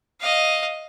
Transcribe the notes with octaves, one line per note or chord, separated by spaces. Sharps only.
D#5 F5